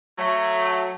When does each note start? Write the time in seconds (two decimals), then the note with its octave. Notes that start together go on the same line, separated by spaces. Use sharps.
0.18 F#3 A3